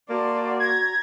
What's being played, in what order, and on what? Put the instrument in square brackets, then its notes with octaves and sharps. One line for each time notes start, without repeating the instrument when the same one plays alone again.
[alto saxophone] A#3 [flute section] F#4 [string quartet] D5 A5 C6
[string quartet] A#5 [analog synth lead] G#6